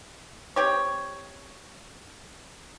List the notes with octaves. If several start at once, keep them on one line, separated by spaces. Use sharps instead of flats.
C4 G4 C#5